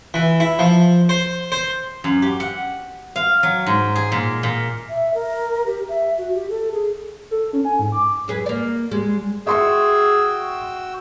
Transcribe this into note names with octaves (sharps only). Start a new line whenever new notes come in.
E3
E4
F3
C5
C5
F#2
G4
F#5
F5
F#3
G#2
G#4
A#2
A#2
E5
A#4
G4
E5
F#4
G4
A4
G#4
A4
C#4
G#5
G#2
D6
F#2 G#4 B4
A#3 D5
G3 G#3
F#4 G#4 E5 G5 C6 C#6 E6